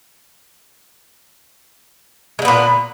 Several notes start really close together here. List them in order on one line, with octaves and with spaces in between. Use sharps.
G#3 D3 B3 A#2